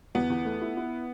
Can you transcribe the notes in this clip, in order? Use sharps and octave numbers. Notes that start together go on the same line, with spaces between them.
E2 B3
E2
A3
E4
E4